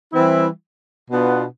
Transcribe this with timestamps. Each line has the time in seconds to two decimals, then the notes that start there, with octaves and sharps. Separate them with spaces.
0.13 E3 G3 C4 E4
1.10 B2 B3 D4 F4